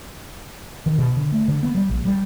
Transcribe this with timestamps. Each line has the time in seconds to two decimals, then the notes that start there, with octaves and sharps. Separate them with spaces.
0.86 D#3
0.98 B2
1.17 D3
1.32 A3
1.48 D3
1.63 B3
1.75 G3
1.89 A#1
2.05 G3